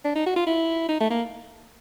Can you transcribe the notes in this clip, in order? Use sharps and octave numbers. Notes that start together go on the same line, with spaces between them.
D4
D#4
F#4
F4
E4
D#4
A3
A#3